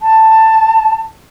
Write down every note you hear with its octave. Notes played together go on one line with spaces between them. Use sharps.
A5